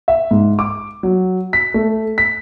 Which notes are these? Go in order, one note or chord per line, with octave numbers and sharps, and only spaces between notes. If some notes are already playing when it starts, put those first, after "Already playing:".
E5
G#2
D6
F#3
B6
A3
B6